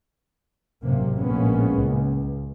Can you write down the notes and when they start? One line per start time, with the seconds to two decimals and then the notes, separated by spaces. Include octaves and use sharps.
0.83 A1 F#2 C3 A#3
1.18 A#1 A2 G#3 A#3 B3 C#4
1.79 C#2